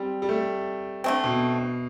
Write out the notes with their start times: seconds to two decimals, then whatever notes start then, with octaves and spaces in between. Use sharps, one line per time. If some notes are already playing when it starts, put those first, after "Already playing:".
Already playing: G3 C4
0.22 G3
0.29 A3
1.04 D3 A3 C4
1.24 B2